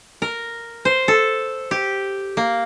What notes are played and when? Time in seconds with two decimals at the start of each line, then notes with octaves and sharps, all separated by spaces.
0.22 A#4
0.85 C5
1.08 A4
1.71 G4
2.37 A#3